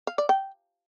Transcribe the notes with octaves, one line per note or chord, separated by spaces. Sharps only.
F5
D5
G5